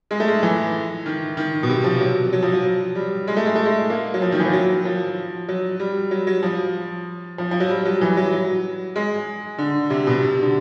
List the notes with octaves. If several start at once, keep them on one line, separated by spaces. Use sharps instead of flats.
G#3
A3
G#3
E3
D#3
D#3
B2
C3
F3
F#3
F#3
F3
F#3
G3
G#3
A3
G#3
A3
G#3
A#3
F#3
F3
D#3
E3
F3
F#3
F3
F#3
G3
F#3
F#3
F3
F3
F3
F#3
G3
F#3
E3
F#3
F#3
G#3
D3
C3
B2
C3
D3